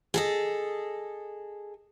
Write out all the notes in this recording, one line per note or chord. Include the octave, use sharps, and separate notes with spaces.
G#4 A4 D#5